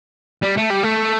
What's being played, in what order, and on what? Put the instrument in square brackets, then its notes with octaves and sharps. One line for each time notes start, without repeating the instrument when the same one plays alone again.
[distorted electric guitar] G3
A3
G3
A3